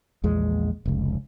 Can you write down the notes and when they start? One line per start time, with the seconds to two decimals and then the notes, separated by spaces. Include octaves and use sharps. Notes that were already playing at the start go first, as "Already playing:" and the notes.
0.24 A#1 E2 G#3
0.86 F1 C#2